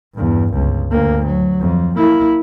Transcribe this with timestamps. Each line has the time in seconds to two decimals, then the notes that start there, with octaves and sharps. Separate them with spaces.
0.14 E2 G2
0.54 G1 C#2
0.91 D2 A#3
1.26 F#3
1.60 F2
1.97 A#3 E4